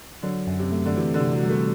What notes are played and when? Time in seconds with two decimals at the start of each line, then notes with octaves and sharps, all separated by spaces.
0.23 D3 F#3
0.47 F#2
0.59 C3
0.72 A3
0.85 D3
0.96 C3 E3
1.14 D3
1.20 C3
1.32 F#3
1.43 G3
1.50 A3